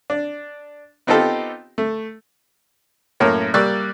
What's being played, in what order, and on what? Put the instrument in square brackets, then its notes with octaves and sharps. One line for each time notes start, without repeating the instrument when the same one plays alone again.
[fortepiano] D4
B3 C4 D#4 F4 G4 A4
A3
F#2 A2 A#3 A#4 C#5
G3 A#3 D5 C#6 E6 F#6